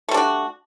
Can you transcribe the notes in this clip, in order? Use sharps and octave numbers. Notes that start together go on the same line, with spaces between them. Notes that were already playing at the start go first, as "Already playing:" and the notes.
G3 A3 D4 F#4